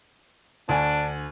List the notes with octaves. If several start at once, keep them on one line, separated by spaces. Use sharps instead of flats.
D2 D4 G#5